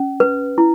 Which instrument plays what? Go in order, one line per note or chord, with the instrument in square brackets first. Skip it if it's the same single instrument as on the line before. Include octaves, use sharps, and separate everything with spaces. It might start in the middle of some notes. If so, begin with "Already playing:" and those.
Already playing: [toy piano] C#4
B4
E4